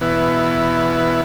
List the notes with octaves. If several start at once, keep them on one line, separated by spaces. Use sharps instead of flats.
E2 B2 B3 E4